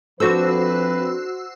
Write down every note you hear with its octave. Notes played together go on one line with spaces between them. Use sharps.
F3 C4 D4 F#4 A4 B4 C5 E6